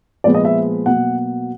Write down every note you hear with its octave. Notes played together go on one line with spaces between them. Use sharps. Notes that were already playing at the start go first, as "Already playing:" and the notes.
A#2 F3 G#3 B3 D5
D#5
E5
B2 F#3 A#3 F#5